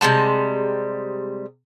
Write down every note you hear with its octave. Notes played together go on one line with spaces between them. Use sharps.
C3 G3 G#3 A5